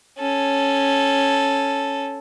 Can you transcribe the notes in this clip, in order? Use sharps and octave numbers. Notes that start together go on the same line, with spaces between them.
C#4 A4